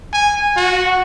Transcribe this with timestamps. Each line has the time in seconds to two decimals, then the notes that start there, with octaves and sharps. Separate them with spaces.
0.13 G#5
0.57 F#4